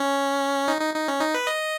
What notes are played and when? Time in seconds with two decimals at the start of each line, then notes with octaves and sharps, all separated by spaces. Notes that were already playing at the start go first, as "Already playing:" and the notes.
Already playing: C#4
0.68 D#4
0.81 D#4
0.94 D#4
1.08 C#4
1.21 D#4
1.34 B4
1.47 D#5